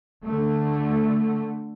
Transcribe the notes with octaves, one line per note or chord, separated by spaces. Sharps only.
D3 A3